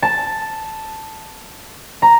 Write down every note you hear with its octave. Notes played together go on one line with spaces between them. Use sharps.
A5
A#5